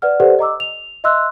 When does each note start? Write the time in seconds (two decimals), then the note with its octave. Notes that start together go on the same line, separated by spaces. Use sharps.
0.02 B4 D5 F#5 F6
0.20 G4 A4 B4 C5 D5 F#5
0.39 D#5 A#5 D6 E6
0.60 F7
1.04 D#5 E5 C6 E6 F#6